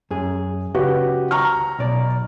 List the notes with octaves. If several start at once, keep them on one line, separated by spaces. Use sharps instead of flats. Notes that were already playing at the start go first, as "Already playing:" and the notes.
F#2 G#4
C#2 F#4 G4 B4
A#5 C#6 F6
B1 B2 D5